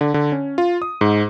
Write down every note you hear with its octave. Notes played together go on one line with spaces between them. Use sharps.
D3
D3
C#4
F4
D#6
G#2